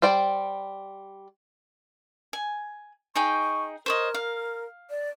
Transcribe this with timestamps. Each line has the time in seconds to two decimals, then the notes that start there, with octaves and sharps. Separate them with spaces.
0.02 G3 C5 D5 G5
2.33 G#5
3.16 D#4 G#4 G5 C#6
3.86 A#4 C5 C#5 D#5
4.14 F5
4.90 D5